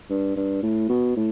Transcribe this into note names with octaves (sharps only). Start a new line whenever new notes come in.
G2
G2
A2
B2
A2